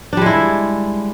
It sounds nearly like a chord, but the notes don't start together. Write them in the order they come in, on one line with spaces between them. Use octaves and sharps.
D4 G3 G#3 E4